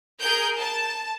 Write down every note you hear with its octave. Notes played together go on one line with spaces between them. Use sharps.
G#4 A#4 G6
A5